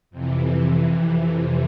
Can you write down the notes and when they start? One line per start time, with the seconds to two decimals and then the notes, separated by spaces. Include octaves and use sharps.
0.11 F2 C3 E3